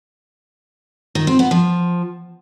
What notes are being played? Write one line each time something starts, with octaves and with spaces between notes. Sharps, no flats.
D#3
C4
B3
F3